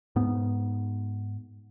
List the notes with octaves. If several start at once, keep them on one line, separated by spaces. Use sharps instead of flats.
G#2 B3